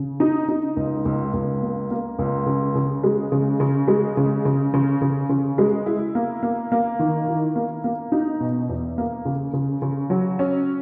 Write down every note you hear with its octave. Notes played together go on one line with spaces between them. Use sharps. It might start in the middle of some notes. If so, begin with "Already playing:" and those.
Already playing: C#3
D#4
D#4
C#2
C#2
C#2
A#3
A#3
C#2
C#3
C#3
G#3
C#3
C#3
G#3
C#3
C#3
C#3
C#3
C#3
G#3
E4
A#3
A#3
A#3
D#3
E4
A#3
A#3
D#4
B2
E2
A#3
C#3
C#3
C#3
F#3
C#4